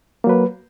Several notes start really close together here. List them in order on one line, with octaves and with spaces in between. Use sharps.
A#3 F#3 B4